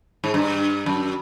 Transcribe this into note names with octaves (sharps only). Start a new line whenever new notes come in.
G#2
G2
F#2